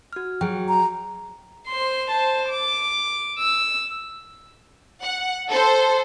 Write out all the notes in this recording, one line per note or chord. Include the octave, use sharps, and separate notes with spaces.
F#4 F6
F#3 G#4 G5
A#5
C5 C6
C5 A5
D6
E6
F#5
A4 C5